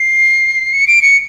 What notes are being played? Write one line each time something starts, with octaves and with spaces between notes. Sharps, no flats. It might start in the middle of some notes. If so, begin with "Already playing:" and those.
Already playing: C7
C#7
D7
C#7